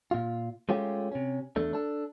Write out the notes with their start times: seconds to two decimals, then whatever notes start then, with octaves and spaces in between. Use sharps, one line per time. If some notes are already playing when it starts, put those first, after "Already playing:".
0.11 A#2 F4
0.69 G#3 A3 C#4 F4 G4
1.12 C3 C#4
1.56 E2 A3 D4
1.73 D4 A4